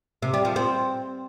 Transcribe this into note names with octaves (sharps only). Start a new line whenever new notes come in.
C3
G3
F3
C4